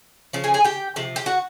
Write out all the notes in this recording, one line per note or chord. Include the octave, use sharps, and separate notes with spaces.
C#3 F3
G#4 G#5
G#4 G#5
G4 G5
C3 F3
G4 G5
F#4 F#5